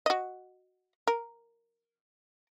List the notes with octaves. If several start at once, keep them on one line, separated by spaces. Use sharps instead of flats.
F#4 D#5
A#4